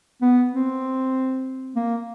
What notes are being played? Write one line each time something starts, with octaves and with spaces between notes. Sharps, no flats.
B3
C4
A#3